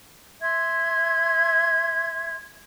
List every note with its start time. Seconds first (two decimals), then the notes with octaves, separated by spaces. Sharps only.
0.41 E5 C6 G#6